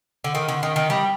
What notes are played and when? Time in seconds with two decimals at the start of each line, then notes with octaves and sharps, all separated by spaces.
0.24 D3
0.35 D#3
0.49 D3
0.63 D#3
0.76 D#3
0.90 G3